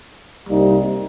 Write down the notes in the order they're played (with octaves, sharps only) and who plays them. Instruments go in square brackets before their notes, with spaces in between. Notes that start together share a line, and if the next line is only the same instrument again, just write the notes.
[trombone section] C2 C3 G3 A#3 D#4